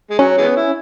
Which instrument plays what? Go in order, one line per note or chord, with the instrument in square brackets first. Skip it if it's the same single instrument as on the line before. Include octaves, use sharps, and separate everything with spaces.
[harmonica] G#3
[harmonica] F#3 [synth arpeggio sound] C#4
[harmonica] E3 G#3 B3
E4